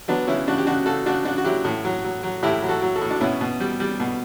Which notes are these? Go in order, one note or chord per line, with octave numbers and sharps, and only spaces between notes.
F#3 B3 D4
C#3 C#4 E4
C#3 D4 F#4
G4
C#3 D4 F#4
C#3 F#4 A4
C#3 D4 F#4
C#3 D4 F#4
F#4
F#3 E4 G4
A2
F#3
F#3
F#3
A2 E4 G4
F#3
F#4 A4
F#3
F#4 A4
A2
D4
B2 C#4 E4
B2
G3
G3
B2